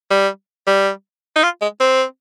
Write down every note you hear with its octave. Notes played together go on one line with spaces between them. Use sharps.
G3
G3
D#4
F4
G#3
C4